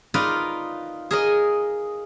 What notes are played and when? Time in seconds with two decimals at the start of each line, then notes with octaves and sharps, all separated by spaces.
0.14 D#4 F4 A#4 B4 D5
1.11 G#4 A#4 D#5